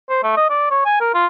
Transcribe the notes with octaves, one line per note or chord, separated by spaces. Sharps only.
C5
A3
D#5
D5
C#5
G#5
A#4
F4